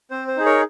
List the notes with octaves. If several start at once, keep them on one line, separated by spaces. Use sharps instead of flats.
C4 C5
C5
D#4 G#4
A#4 C#5